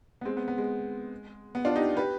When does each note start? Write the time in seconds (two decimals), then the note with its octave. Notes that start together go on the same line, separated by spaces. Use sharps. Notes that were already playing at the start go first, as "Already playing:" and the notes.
0.21 B3
0.25 G#3 C4
0.37 B3
0.48 B3
0.58 G#3
1.55 B3
1.65 D4 F4
1.76 D#4 G4
1.97 G4 B4